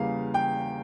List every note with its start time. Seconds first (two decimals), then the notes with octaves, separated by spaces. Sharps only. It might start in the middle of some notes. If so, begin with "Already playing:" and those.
Already playing: E2 C#3 G3 A#3 F5
0.34 G5